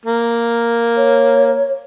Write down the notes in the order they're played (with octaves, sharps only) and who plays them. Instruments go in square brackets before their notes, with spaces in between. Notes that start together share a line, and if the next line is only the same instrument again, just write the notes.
[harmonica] A#3
[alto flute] C#5